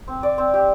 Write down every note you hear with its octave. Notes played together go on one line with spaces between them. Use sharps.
C4
D5
C4
G4